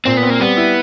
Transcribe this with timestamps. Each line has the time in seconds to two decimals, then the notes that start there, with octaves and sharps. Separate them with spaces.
0.05 A#2 C4
0.17 B3
0.23 C4
0.30 A#3
0.40 G3 B3
0.57 E4